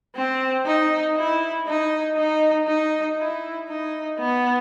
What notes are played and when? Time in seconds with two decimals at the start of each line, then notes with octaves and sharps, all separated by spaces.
0.16 C4
0.66 D#4
1.17 E4
1.67 D#4
2.17 D#4
2.68 D#4
3.19 E4
3.69 D#4
4.19 B3